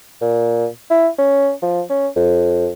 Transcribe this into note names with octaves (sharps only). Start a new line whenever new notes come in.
A#2
E4
C#4
F3
C#4
F2